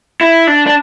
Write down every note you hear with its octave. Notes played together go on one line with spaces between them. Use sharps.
E4
D4
D4